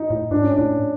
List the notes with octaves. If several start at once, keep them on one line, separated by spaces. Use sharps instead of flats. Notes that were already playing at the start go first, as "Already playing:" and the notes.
Already playing: D#4
A2
G#2 D4
C#4
D4
A2